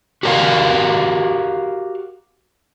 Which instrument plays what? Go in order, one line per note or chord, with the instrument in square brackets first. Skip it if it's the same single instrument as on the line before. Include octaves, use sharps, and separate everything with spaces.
[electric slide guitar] F#4 G4 A#4 C5 D5 F5